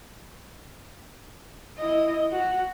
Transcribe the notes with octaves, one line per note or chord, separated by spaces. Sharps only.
E4 D#5
F#4